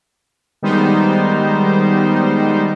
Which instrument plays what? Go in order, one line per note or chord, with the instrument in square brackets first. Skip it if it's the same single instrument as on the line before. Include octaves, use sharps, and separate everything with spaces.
[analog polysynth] D#3 G3 G#3 B3 D#4 C5